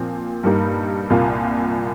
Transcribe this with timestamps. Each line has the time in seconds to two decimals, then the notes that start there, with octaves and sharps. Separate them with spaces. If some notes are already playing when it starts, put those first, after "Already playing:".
Already playing: A#2 F3 C4
0.43 G2 G3 A#3 D#4
1.10 C2 A#2 A#3 F4